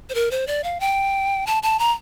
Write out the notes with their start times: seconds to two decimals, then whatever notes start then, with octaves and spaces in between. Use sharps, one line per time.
0.10 C5
0.14 A#4
0.31 C5
0.47 D5
0.64 F5
0.80 G5
1.47 A5
1.63 A5
1.79 A#5